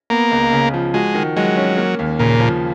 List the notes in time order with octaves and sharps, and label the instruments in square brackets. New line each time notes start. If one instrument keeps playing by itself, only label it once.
[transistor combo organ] A#3 [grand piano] B3
[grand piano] C#2
C#3
F3
[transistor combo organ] G#3 [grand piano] F#4
[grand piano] D#3
[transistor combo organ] F#3 [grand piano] G#3
[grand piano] C#4
A#3
D#2
[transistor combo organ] A#2 [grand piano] C#3
[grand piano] F3